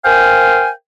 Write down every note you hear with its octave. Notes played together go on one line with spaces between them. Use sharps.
A#4 C5 F5 G5 G#5